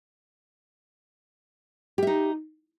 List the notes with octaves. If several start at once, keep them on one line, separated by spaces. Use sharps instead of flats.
D#4 G4 E5